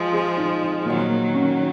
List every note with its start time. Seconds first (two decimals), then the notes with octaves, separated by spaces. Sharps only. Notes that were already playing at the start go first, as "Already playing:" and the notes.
Already playing: F3 G#3
0.13 G#4
0.37 D#4
0.61 D#4
0.85 A#2 D#3 F#3
1.10 A#3
1.34 C#4